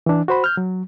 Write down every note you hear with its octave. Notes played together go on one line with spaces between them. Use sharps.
E3 D4
F#4 C5 B5
F6 G6
F#3